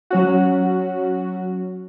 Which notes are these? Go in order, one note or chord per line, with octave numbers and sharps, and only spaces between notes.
F#3 C#4 F#4